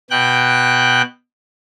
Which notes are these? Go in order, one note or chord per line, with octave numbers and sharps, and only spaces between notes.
B2 G5 F#6